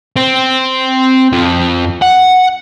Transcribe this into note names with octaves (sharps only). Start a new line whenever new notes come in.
C4
F2
F#5